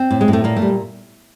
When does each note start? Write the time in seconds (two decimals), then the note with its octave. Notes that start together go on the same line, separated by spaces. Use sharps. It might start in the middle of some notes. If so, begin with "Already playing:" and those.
Already playing: C4
0.11 A2
0.21 G#3
0.28 A2
0.33 A3
0.44 A#2 A#3
0.56 A3
0.62 G3